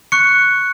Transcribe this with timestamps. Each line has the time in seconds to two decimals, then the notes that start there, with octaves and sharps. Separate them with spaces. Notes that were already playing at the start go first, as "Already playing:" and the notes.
0.12 C#6 F#6 C#7